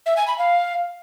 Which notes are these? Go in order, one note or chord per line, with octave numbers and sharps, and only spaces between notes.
E5
G#5
B5
F5